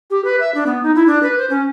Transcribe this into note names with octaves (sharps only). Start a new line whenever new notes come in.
G4
B4
E5
D4
B3
D#4
E4
D4
B4
C5
C#4